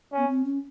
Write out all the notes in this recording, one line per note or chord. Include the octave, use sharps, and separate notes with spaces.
B3 C#4
C4
C#4